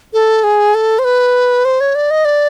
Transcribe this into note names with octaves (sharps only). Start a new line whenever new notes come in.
A4
G#4
A4
C5
B4
C5
C#5
D5
D#5
D5